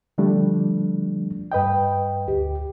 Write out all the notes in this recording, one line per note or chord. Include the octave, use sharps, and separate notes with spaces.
D3 F3 G3 A3 D4
G2 B4 D#5 G5
D2 G4